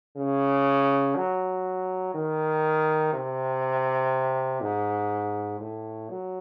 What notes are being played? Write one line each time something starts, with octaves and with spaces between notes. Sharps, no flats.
C#3
F#3
D#3
C3
G#2
A2
F#3